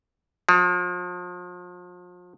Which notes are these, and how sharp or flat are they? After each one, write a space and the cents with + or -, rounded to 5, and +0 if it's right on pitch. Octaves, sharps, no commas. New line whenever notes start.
F3 +35